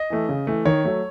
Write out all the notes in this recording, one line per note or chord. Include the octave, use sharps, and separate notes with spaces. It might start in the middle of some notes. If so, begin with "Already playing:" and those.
Already playing: D#5
E3 A3
C#3
E3 A3
D#3 C#5
F#3 A3